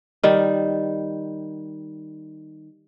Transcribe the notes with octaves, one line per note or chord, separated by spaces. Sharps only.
D#3 G3